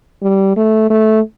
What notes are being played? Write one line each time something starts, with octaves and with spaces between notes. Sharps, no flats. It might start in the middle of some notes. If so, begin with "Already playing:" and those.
G3
A3
A3